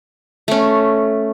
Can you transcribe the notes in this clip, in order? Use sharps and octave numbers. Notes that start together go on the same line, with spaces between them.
A3 C#4